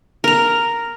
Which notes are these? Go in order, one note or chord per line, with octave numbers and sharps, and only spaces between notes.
A#4 A#5